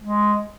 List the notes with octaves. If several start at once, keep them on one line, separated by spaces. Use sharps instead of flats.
G#3